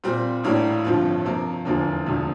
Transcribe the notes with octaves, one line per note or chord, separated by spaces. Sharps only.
A#2 G3 C4
A1 A2 G3 A#3 D4
G1 G2 F3 C4 F4
C3 F3 A#3
F1 E2 D3 F3 A#3
E1 D2 C3 F3